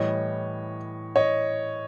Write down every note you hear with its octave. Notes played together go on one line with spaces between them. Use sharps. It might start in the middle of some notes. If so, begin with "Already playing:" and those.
Already playing: A2 E3 G3 C#5 D#5
C#5 D#5